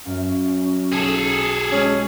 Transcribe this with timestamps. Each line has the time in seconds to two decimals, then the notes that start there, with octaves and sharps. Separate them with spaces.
0.05 F#2 C#4 F5
0.93 B1 G#4 A4
1.72 G#3 C#4